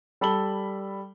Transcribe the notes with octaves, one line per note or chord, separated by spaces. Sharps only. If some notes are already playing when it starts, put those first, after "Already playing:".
G3 A4 B5 E6 F#7 G7